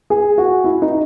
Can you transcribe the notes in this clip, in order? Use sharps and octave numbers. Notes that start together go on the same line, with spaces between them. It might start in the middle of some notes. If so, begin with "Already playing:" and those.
G#4
F#4
E4
D#4